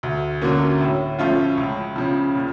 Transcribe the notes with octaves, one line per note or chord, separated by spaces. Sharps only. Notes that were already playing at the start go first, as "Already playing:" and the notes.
D2
D3 F#3 A#3 C#4
A2
F3 A3 C#4 F4
C#2
C#3 F3
A#2